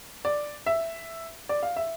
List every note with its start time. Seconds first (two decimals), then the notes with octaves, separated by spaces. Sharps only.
0.25 D5
0.66 E5
1.49 D5
1.63 F5
1.76 E5